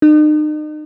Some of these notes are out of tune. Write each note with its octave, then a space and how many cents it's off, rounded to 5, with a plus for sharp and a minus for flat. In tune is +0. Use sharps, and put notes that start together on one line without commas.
D#4 -40